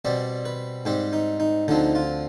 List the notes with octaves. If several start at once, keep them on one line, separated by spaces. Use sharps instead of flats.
B2 G3 C4 D5
B4
G#2 G3 C4 G4
D#4
D#4
D2 D3 F3 C4 D#4
F4